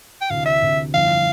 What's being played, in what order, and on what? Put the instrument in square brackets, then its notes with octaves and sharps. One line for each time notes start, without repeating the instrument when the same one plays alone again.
[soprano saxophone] G5
[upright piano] D2 C3 E3 [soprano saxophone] F5
[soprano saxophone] E5
[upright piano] D2 C3 E3
[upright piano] G1 F2 E3 [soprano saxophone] F5